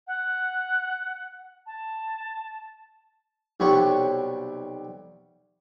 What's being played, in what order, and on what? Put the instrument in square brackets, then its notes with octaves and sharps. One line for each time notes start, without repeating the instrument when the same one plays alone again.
[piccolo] F#5
A5
[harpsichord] B1 C3 G3 C#5 F#5